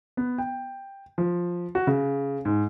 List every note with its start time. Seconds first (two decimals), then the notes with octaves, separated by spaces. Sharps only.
0.17 B3
0.38 G5
1.18 F3
1.75 F#4
1.87 C#3
2.45 G#2